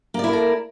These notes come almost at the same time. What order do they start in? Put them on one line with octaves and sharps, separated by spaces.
A#3 D5 E4 A#4 A4